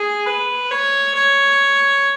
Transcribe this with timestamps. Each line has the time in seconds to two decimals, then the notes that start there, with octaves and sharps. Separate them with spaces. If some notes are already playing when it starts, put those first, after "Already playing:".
Already playing: G#4
0.26 B4
0.71 C#5
1.15 C#5